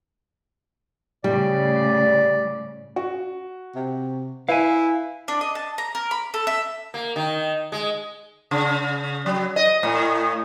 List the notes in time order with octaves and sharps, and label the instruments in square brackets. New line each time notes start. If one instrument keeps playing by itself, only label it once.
[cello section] A2 C#3 [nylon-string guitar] G3 [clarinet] D5
[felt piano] F#4
[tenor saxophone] C3
[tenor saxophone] E4 [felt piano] B4 [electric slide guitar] F5 G#5
[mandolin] D4
D#5
A5
A#5
A#4
B5
A4
E5
[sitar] A#3
D#3
G#3
C#3
F#3
D#5
A2